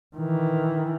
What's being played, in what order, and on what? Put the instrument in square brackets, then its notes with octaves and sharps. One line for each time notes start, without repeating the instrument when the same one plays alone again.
[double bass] D#3 E3